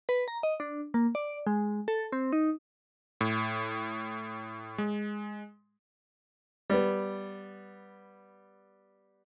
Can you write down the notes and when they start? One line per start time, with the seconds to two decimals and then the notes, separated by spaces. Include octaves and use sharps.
0.09 B4
0.28 A#5
0.43 D#5
0.60 D4
0.94 A#3
1.15 D5
1.47 G#3
1.88 A4
2.12 C4
2.33 D#4
3.21 A2
4.78 G#3
6.70 G3 B3